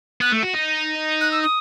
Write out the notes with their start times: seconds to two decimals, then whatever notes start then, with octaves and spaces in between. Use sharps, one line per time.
0.21 B3 F#6
0.32 A3
0.43 F#4
0.54 D#4
1.21 F#6
1.31 E6
1.42 D#6